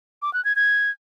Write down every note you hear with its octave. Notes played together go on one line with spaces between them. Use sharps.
D6
F#6
G#6
G#6